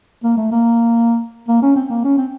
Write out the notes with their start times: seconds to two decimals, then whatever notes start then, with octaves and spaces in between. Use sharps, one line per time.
0.24 A#3
0.37 A3
0.52 A#3
1.49 A#3
1.62 C#4
1.76 C4
1.90 A#3
2.04 C#4
2.18 C4